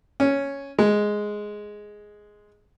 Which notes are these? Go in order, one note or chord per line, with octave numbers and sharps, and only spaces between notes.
C#4
G#3